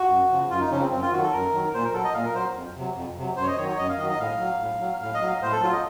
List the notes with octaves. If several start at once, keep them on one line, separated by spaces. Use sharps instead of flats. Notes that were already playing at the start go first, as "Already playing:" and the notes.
Already playing: F#4
F#2
C#3 F3
F#2 F4
D#4
C#3 F3 C#4
C4
F#2 C4
F4
D#3 F#3 F#4
A4
F#2 A#4
D#3 F#3
A#2 C5
A#4
F#3 A4
D#5
A#2 F5
A#4
F#3 C5
F2
C3 F#3
F2
C3 F#3
F#2 C5
C#5
D#5
D#3 F#3 C#5
C#5
F#2 D#5
F5
D#3 F#3 D#5
D#5
A2 F5
F#3
A2
F#3
A2 F5
D#5
F#3
F5
A2 C5
A4
F#3 F4
D#5